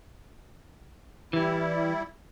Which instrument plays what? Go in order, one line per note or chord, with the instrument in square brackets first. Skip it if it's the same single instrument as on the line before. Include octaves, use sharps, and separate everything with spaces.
[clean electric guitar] E3 [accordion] G3 E4